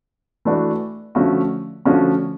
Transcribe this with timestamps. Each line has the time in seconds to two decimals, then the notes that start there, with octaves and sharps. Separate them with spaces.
0.45 E3 A3 D4 F#4
1.15 D3 F3 A3 C#4 F#4
1.85 D3 F3 A3 C#4 F#4